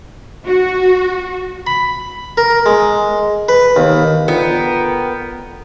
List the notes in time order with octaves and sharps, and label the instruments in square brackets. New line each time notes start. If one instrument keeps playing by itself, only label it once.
[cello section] F#4
[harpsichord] B5
A#4
G#3
B4
D#2
[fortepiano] D3 F4 [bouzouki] B3 [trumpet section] A#4 G5